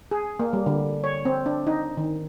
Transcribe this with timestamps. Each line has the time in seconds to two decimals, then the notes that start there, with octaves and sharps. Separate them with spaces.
0.11 G#4
0.39 A#3
0.53 G3
0.66 D3
1.04 C#5
1.25 C4
1.46 D4
1.67 D#4
1.97 D#3